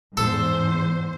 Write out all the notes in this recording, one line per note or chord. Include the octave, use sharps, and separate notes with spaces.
E2 G#2 A4 C5